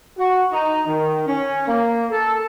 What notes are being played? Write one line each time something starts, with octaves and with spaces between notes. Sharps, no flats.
F#4
D#4
D#3
C#4
A#3
A4